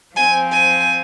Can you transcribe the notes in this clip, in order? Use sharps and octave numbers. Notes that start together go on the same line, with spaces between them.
F3 C4 G#5
G#5